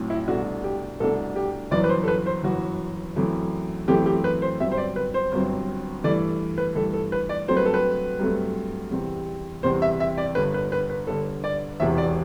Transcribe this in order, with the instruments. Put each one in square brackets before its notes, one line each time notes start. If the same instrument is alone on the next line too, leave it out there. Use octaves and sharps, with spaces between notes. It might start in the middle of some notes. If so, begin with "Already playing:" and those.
Already playing: [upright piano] B1 A2 F#3 C4
E4
C2 B2 A3 D4 F#4
G4
C2 B2 A3 D4 A4
G4
G1 F#2 E3 D5
B4
C5
A4
B4
C5
G1 F#2 E3 F#4
F#2 E3 A3 C4
F#2 E3 A3 C4 G4
G4
B4
C5
G1 G2 F#3 C4 E5
C5
D5
B4
C5
G1 G2 F#3 C4
G2 E3 A3 D5
B4
G2 E3 A3 A4
A4
B4
D5
G2 F#3 A3 C4 C5
B4
A4
B4
G2 F#3 A3 C4
E2 C3 G3 C4
E2 C3 G3 C4 C5
E5
E5
D5
G1 G2 D3 B4
B4
B4
B4
G1 G2 D3 A4
D5
E1 E2 C3 E5
D5